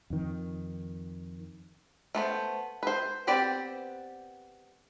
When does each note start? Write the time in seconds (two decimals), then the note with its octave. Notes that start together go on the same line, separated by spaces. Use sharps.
0.10 F2 D#3
2.15 A3 B3 C5
2.83 B4 C5
3.27 B3 C4 G4 B4 D5